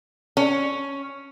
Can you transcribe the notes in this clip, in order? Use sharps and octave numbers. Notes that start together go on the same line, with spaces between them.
C#4